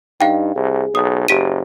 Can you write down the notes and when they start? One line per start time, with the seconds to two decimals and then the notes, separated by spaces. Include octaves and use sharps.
0.21 G2 D#4 F5 G5
0.56 C2 G#4
0.95 B1 D#6
1.28 F#1 G4 B6 D#7